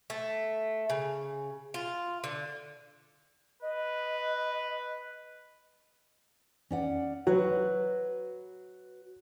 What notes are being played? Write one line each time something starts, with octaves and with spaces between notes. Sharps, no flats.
A3
C#3
F4
D3
B4 D#5
C#4 D5 F#5
F#3 F#4 B4